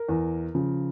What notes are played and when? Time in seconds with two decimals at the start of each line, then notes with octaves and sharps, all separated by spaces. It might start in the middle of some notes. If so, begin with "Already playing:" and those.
Already playing: A#4
0.09 E2
0.55 C#3 F3